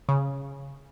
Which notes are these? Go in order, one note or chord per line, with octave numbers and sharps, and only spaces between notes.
C#3